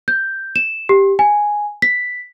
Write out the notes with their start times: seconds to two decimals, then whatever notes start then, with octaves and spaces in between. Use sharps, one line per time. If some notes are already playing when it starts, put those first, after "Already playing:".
0.08 G6
0.56 E7
0.89 G4
1.19 G#5
1.82 B6